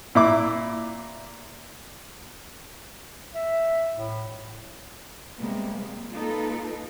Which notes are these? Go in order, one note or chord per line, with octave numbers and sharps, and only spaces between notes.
A#2 E4 D6
E5
A2
C3 G3 G#3 A#3 B3
A#3 D#4 F4 A4 B4